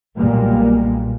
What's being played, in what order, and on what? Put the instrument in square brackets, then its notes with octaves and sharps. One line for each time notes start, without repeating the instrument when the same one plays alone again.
[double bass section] B1 A#2 G3 G#3 A#3